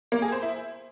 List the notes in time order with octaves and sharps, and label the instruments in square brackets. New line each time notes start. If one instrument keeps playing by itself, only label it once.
[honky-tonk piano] A#3
G#4
C5
E4